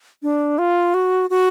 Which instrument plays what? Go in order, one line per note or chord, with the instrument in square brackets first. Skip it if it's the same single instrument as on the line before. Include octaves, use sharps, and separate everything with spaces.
[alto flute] D4
F4
F#4
F#4